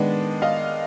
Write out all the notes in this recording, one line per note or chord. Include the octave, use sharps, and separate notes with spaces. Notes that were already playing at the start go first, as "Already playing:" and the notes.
Already playing: D#3 G#3 B3 D4
D#5 F5